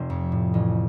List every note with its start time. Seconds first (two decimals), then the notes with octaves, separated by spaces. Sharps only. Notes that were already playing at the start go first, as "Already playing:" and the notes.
Already playing: F1 C5
0.10 F2
0.32 A2
0.54 A1